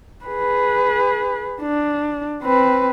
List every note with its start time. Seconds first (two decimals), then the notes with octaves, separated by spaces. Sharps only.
0.25 G#4 B4
1.62 D4
2.42 C4 B4